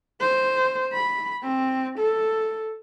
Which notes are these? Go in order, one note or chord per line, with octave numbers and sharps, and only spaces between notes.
C5
B5
C4
A4